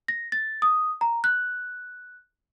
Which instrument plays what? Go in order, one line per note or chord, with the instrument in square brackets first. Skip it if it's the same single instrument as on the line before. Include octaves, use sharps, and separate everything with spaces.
[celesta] A#6
A6
D#6
A#5
F#6